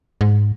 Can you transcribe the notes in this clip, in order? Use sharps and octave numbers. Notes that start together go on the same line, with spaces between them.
G#2